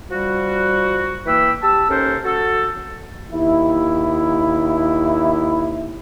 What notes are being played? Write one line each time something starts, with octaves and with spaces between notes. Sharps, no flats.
F3 G3 F#4
E3 A#3 G5 B5 E6
G4 A5 E6
D#2 C#4 A4 A#4 C5
F#4 A4
D#2 E4